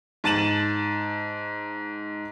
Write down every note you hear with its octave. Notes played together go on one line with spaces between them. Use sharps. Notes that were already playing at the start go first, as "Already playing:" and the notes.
G#2 A5 A6 D#7 E7 F#7